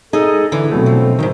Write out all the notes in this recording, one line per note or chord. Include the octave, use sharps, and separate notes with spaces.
D#4 G#4 A4 D#5
D3 E3
B2 F#3 A3 C4
F3
E2 G#2 D#3